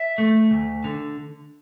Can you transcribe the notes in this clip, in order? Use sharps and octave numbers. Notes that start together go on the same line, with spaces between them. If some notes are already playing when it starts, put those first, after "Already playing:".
Already playing: E5
A3
D2
D3